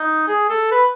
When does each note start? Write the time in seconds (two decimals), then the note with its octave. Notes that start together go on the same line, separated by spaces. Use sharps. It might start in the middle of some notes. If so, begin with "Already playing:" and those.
Already playing: D#4
0.28 G#4
0.50 A4
0.72 B4